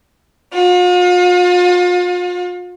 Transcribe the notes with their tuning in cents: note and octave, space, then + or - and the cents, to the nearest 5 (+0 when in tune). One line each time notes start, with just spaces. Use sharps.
F4 +40